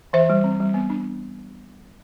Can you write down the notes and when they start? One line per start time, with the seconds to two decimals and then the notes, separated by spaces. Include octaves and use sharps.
0.13 E3 C5 E5
0.30 G3
0.44 C4
0.60 G3
0.74 B3
0.90 D4